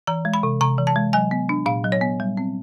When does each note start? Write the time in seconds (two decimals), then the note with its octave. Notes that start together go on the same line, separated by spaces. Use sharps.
0.07 E3 A#5
0.25 G#3
0.34 B5
0.43 C3
0.61 C3 A#5
0.78 E3
0.87 A5
0.96 G#3
1.13 F#3 G#5
1.31 B3
1.49 D4
1.66 A#2 F5
1.84 F#3
1.92 C#5
2.01 B3
2.20 G3
2.37 C4